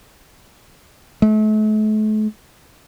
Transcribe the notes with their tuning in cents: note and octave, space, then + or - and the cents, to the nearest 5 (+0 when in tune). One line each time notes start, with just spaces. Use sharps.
A3 -40